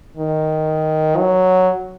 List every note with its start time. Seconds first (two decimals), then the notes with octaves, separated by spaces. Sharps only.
0.17 D#3
1.18 F#3